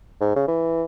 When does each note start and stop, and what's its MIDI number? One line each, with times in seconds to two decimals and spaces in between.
0.20 0.33 44
0.36 0.44 49
0.48 0.84 52